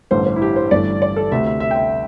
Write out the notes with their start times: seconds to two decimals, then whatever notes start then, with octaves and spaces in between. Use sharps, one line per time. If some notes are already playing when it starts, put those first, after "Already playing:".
0.11 A1 G2 D3 A3 C5
0.26 C5
0.36 E4
0.42 G4
0.56 C5
0.71 G1 G2 E3 A3 D5
1.02 D5
1.17 A4
1.31 D2 C3 A3 E5
1.47 E5
1.60 E5
1.71 G5
1.76 E5